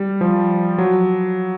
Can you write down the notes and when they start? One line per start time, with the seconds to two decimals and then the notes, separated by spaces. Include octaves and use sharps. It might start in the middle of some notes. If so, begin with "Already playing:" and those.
Already playing: G3
0.21 F3
0.78 F#3